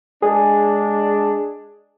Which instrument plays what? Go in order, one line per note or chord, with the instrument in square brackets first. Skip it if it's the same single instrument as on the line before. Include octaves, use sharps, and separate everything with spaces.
[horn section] G#3 D4 [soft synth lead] G#4